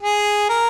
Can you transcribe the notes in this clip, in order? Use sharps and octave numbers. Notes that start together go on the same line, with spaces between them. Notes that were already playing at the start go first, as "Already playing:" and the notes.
G#4
A#4